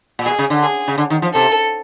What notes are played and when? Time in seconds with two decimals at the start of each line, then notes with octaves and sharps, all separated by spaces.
0.19 A#2
0.26 B2 G#4
0.39 C#3
0.50 D3
0.62 G#4
0.88 C#3
0.98 D3
1.10 D#3
1.22 F3
1.34 C3 A4